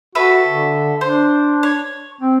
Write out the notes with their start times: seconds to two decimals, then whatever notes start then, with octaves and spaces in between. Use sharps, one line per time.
0.15 F#4 A4 B4 E5
0.47 D3
1.01 D4 C5
1.63 C#5
2.21 C4